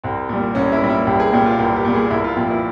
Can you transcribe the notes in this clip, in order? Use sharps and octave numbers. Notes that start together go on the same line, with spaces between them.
C2 C4
A#2 G3
C2 C#4
E4
A#2 G3
E4
C2 G4
G#4
A#2 G3 G4
F4
C2 G4
G4
A#2 G3
G#4
C2 E4
F4
A#2 F3 G4
E4